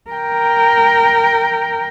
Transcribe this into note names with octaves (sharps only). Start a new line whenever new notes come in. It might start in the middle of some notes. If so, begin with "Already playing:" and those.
A#4 G5